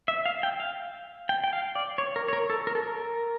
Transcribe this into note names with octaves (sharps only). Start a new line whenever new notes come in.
E5
F5
G5
F5
G5
G5
F5
D5
C#5
A#4
C#5
A#4
A4
A#4
A4
A#4